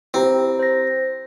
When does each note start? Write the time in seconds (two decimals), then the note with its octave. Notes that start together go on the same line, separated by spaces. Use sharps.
0.14 C4 E4 G4 A#5
0.59 C5 A#6